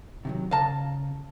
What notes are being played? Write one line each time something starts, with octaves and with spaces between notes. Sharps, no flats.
C3 D#3 F#3
C#3 F5 A5 A#5